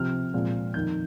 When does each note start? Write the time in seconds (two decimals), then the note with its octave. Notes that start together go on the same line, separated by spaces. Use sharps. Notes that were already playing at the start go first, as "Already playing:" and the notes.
Already playing: C3 F3 C4 F6
0.34 A#2 F3 G#3 C4
0.74 F2 D#3 A#3 D#4 G6